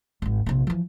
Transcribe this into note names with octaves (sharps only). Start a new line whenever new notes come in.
D#1 G#1
A#1 C3
E3 F3